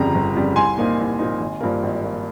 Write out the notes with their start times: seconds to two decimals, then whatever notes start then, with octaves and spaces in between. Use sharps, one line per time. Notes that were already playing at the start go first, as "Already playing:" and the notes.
Already playing: G1 F2 C#3 G3 A#5
0.15 G1
0.35 F2 C#3 G3
0.56 C2 G#5 C6
0.78 A#2 F3 A#3 D#4
0.98 C2
1.19 A#2 F3 A#3 D#4
1.40 G#1
1.61 G2 F3 A#3
1.83 G#1
2.04 F3 A#3